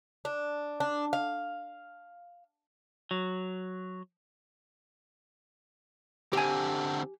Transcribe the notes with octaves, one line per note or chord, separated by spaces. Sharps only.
D4
D4
F5
F#3
D3 C4 G4 G#5